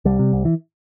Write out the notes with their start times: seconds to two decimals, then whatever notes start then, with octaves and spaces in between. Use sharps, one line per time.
0.05 C2 G3
0.19 C3
0.33 C2
0.45 E3